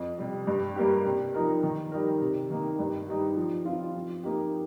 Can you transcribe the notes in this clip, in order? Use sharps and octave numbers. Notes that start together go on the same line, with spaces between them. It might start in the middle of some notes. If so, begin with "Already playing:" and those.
Already playing: F2
C3 G3
G2
G3 A#3 G4
C3
F3 D#4 A#4
D#3
G3 D#4 A#4
C3
D#3 A#3 D#4
G2
G3 D#4 G4
F3
C4 F4
F3
A#3 D#4 G4